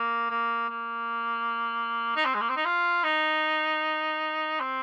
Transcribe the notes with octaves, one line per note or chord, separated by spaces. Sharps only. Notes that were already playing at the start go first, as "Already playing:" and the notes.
Already playing: A#3
A#3
A#3
D#4
C4
G#3
A#3
C4
D#4
F4
D#4
C4